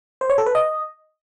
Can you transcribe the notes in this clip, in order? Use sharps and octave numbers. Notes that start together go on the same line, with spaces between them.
C5
C#5
A4
B4
D#5